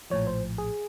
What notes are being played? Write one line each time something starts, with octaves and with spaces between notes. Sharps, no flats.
A#1 A2 F3 C#5
C5
G#4